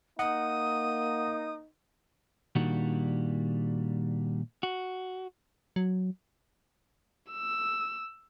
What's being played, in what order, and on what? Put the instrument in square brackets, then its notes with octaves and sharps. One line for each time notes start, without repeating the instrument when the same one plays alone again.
[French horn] A#3 [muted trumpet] D#4 [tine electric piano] F#5 [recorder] D#6
[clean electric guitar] A#2 D#3 G3 D4 F#4
F#4
[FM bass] F#3
[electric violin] E6